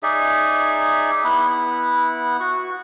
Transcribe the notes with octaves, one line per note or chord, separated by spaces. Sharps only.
D#4 G#4 D5 E5
B3 E4 F#5
F#4 C#6